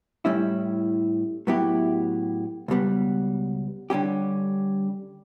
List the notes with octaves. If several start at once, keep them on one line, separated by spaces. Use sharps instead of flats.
A2 G3 C#4 E4
A2 F#3 B3 E4 G4
C#2 B2 G3 B3
D3 G3 C#4 G4